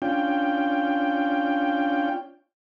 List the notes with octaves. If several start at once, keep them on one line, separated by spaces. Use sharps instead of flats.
C#4 D4 F4 G5